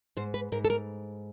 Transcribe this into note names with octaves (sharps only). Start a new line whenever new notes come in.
G#2 C5
B4
G#2 A#4
A4
A#4